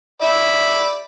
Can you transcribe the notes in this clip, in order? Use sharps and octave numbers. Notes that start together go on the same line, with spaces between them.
D5 E5 B5